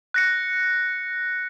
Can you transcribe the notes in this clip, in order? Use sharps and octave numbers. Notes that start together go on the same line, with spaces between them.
F#6 A#6 C#7